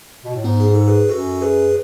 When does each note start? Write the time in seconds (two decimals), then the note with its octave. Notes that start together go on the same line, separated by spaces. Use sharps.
0.25 B2
0.35 A2
0.44 G#2 B3 D#4
0.60 G#4
0.74 A4
0.88 G#4 B4
1.09 F#2 F#4 A4
1.41 G#4 B4